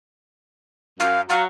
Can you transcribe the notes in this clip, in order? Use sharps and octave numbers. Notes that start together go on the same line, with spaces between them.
F#2 F5
F#3 F5